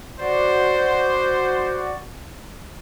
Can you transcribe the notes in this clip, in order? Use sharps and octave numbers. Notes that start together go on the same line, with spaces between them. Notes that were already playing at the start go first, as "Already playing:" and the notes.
F#4 C5 D5